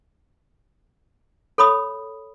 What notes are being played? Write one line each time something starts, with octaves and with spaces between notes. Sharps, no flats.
A4 C#5 B5 D#6